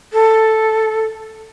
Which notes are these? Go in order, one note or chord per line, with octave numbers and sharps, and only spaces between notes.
A4